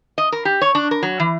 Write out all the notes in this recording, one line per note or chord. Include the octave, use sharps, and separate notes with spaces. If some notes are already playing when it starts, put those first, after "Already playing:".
D#5
A#4
G4
C#5
D4
A#4
F#3
E3